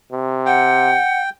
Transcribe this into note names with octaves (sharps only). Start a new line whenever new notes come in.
C3
F#5 G5